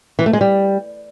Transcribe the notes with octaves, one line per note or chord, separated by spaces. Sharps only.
E3
A3
G#3
G3